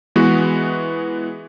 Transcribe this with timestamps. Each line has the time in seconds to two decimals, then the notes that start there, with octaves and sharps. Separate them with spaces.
0.16 E3 G#3 B3 F#4